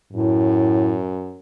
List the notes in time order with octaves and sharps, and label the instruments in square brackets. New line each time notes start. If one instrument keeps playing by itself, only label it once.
[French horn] F#2 [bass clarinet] A2